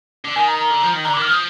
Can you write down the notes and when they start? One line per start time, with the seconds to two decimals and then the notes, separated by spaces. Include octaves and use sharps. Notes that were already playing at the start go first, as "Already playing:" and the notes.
0.25 D3
0.36 D#3 G#5
0.47 A#5
0.59 A#5
0.70 D3
0.82 F3
0.93 D#3
1.05 D3 A#5
1.14 D6
1.16 D#3
1.22 F6
1.28 F3 D#6